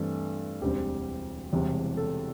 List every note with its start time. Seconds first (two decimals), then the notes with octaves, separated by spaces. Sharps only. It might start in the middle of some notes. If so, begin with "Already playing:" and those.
Already playing: G2 E3 A3 C4 A4
0.61 E1 D2 D3 G3 C4 G4
1.53 E1 E2 C3 G3
1.97 A4